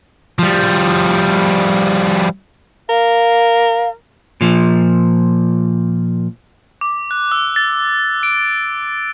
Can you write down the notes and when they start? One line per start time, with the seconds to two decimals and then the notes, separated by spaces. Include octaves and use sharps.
0.39 F3 G3
2.90 A#4 F5
4.41 A#2 F3
6.81 D6
7.11 F#6
7.31 E6
7.56 A6
8.23 D7